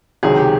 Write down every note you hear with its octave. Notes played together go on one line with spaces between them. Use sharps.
C#2 C3 D#3 F#3 G#4
G4